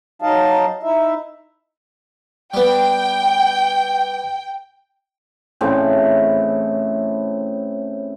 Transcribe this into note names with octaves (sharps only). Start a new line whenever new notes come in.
F#3 D#4 D#5 F5 A5
D#4 E4 E5
G3 B3 G5
A2 C#3 E3 C4